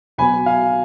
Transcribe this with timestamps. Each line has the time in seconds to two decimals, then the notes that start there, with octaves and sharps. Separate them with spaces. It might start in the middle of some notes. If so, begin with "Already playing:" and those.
0.18 B2 F#3 B3 G#5 B5
0.46 F5 G#5